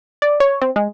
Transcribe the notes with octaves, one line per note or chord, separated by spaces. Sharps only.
D5
C#5
C4
G#3